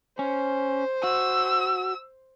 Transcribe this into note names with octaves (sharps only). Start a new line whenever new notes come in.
C#4 C5
F#4 E6